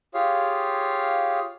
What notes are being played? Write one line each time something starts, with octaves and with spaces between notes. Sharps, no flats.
F4 G4 G#4 C#5 F5